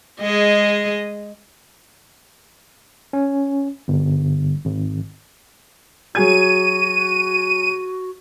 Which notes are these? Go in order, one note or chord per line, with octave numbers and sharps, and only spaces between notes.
G#3 G#4 D#5
C#4
G1
G#1
F#3 F#4 G#4 G#6 D#7